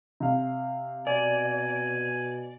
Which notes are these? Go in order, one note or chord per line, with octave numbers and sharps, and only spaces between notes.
C3 F5
B2 D5 G#5